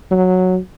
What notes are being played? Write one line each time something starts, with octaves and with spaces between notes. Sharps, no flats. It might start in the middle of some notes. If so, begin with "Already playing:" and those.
F#3